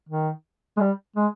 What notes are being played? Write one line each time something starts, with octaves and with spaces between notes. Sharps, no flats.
D#3
G#3
G3
G#3